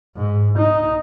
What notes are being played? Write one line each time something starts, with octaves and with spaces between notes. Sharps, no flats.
G#2
D#4